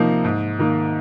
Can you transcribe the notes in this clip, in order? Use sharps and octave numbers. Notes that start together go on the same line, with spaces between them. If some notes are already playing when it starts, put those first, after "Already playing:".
Already playing: C3 F3 A#3 D#4
G#2
D#3 A#3